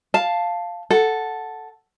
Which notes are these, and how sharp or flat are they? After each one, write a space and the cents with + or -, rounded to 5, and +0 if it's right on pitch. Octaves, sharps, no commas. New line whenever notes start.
F5 +0 A5 +0
A4 +0 F#5 +0